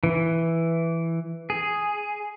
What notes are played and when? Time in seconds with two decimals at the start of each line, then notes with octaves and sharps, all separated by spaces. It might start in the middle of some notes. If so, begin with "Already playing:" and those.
0.04 E3
1.50 G#4